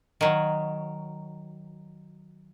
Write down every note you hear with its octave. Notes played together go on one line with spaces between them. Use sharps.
D#3 F#3